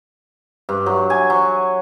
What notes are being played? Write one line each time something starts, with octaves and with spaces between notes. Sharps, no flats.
G2
F#3
G#5
F#3